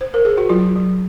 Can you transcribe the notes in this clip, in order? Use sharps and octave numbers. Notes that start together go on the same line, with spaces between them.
C5
A#4
G#4
F#4
F#3 F4
F#3